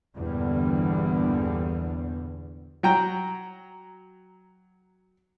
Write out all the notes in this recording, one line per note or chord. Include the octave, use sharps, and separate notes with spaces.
A#1 E2 G2 D3 G3
F#3 G5 A#5